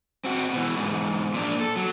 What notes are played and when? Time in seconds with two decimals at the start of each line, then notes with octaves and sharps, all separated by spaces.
0.25 C4 F#4
0.53 B2 E3
0.76 E2 G#2
1.34 A#2 D4
1.61 A4
1.76 F#3